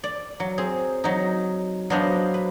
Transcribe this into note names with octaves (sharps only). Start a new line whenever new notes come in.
D5
F#3
C4 G#4
F#3 D#4
F#3 B3 D4 C5 D#5 F5
B4